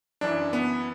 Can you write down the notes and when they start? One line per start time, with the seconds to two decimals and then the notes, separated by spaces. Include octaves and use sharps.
0.21 F#2 E3 D4
0.53 B3